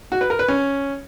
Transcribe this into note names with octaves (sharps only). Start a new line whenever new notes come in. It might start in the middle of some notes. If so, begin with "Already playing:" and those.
F#4
B4
A#4
B4
C#4